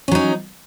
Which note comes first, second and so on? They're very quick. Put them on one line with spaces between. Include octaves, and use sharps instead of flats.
C#4 F#3 D#4